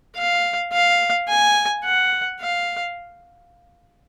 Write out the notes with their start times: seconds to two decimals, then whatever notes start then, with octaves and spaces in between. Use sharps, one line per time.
0.16 F5
0.72 F5
1.28 G#5
1.84 F#5
2.40 F5